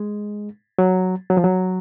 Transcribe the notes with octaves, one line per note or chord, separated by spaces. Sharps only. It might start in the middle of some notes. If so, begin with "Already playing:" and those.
Already playing: G#3
F#3
F#3
F3
F#3